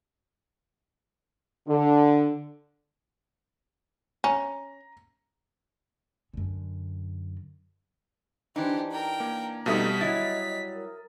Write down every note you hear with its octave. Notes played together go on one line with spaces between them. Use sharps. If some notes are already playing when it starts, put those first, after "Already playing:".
D3
C#4 A#5
F#2 D3
E3 D4 D#4 G4 C5
A#4 G5 A#5
A#3
F2 B2 G3 A3 D#4 D#6 B6
F#3 G3 E4 D#5 A6
A#4